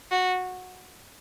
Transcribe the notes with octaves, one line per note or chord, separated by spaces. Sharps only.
F#4